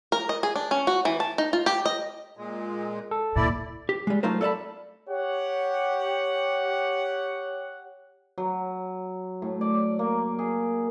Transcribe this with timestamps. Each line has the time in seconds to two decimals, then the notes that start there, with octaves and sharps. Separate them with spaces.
0.12 A#4
0.29 D#5
0.43 G#4
0.56 D4
0.71 C#4
0.87 F#4
1.05 E3
1.20 A5
1.38 D#4
1.53 F4
1.66 G4
1.86 D#5
2.37 A#2 G#3
3.11 A4
3.36 D#2 A#2 E4 D5
3.89 G4
4.07 G3 G#3
4.23 F#3 A3 D#4 F4 A#4 C5
4.41 A4 D5 F5 A5 B5
5.09 G4 C#5 F#5
8.38 F#3
9.42 A2
9.61 D5
9.99 A#3
10.39 G#4